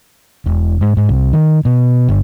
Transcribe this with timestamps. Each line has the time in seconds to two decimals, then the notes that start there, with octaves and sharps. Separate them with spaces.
0.46 E1
0.81 G#2
0.97 G#2
1.09 C2
1.33 D#3
1.65 B2
2.09 G1